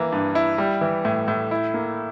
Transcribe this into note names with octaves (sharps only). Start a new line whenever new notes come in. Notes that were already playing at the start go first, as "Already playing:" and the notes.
Already playing: E3 A#3
G2
E4
G3
E3
A2
A2
E4
A#3